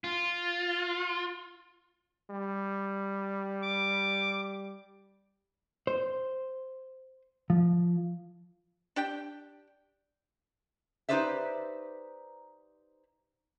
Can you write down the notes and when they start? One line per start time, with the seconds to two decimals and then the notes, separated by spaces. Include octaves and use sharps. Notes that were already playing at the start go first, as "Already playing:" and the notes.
0.04 F4
2.31 G3
3.63 D6
5.87 C5
7.50 F3
8.96 D4 G4 G5
11.09 D#4 G4 B4 C5 D5 E5